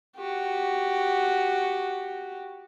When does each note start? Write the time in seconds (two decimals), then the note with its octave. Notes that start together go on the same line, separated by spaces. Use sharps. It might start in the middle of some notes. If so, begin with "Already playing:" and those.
0.17 F#4 G4